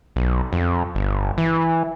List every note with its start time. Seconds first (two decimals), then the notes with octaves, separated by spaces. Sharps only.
0.16 B1
0.53 F2
0.95 G1
1.38 E3